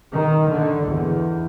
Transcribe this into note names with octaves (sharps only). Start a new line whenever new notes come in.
D#3
D3
E2